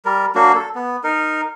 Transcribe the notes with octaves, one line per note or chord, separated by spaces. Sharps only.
G3 A#4
F#3 A#3 D4 F#4
A4
B3
D#4 A#4